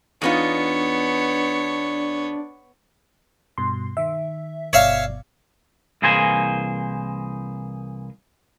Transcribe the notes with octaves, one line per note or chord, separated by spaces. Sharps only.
E2 B3 D4 D#4 F4 C#5
G2 B2 C6
D#3 E5
G1 B2 C#5 D5 E5 F5
C2 E3 A#3 G#4 C5 G#5